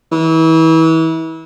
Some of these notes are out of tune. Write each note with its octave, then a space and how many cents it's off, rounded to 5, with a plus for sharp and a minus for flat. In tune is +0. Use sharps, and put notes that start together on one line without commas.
E3 -30